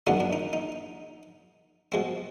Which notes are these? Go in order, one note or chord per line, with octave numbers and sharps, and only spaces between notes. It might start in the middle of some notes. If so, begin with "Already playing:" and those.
F#2 D#3 G#3 B3 D4 D#4
D4
D#4
D#4
B2 G#3 C4